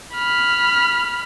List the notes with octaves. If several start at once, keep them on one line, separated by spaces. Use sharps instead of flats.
B5 F6